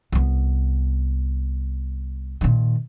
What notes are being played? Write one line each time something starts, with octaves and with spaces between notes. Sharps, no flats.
C2 B3
A#2 D#3